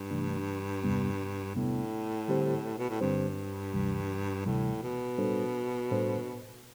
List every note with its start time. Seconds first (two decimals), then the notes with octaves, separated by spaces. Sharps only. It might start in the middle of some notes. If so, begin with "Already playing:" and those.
Already playing: G2
0.11 C3 E3 A3 D4
0.83 E2 C3 G3 B3 D4
1.55 E2 A2 C3 G3 B3 D4
2.28 D3 G3 C4 G4 C5
2.78 B2
2.89 A2
3.01 G2 D3 G3 C4 G4 C5
3.73 D2 C3 E3 G3
4.46 D2 A2 C3 E3 G3
4.82 B2
5.18 A2 G3 D4 A4 C5
5.91 A2 G3 D4 A4 C5